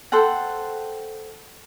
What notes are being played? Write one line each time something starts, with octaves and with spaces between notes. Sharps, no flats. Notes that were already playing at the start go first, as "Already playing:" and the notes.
A4 C5 F#5 G5